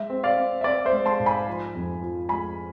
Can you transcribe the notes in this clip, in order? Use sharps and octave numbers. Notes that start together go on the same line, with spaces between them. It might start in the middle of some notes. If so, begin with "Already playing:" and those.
Already playing: G#3 E5
C4
D5 F5
C4
E5
C4 D5
C5 E5
G#3
A5 C6
G#2
G#5 B5
F3
F2
F3
G#3 G#5 B5